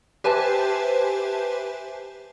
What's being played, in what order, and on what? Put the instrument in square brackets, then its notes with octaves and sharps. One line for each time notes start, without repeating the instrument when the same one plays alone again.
[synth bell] G4 B4 C5 E5 G#5 A5